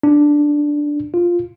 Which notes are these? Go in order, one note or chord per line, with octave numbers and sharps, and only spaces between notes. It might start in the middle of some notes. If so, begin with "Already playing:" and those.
D4
F4